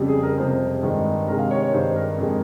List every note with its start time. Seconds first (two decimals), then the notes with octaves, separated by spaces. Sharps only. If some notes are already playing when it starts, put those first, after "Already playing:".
Already playing: F2 C#3 G3
0.08 G#4
0.23 A#4
0.38 F2 C3 G3 C5
0.83 G2 D#3 G#3
1.28 C3 D#3 G#3 A#4
1.39 F5
1.51 C#5
1.62 C#5
1.73 G2 D#3 G3 C5
1.96 A#4
2.18 F2 D#3 G#3